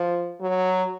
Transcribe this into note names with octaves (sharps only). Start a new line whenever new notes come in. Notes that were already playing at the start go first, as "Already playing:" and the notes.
Already playing: F3
F#3